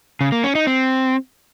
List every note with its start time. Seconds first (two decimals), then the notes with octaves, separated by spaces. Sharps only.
0.21 C#3
0.32 A#3
0.44 C#4
0.55 D#4
0.67 C4